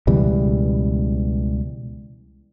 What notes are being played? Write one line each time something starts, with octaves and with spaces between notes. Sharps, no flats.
C#2 B2 E3 G3